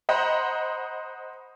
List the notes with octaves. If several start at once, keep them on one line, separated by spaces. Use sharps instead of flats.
C5 D#5 F#5 A#5 B5